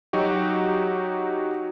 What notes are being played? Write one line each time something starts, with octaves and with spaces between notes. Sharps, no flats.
F#3 D#4 F#4 G4